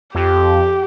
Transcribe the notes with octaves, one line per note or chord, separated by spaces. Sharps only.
F2 G4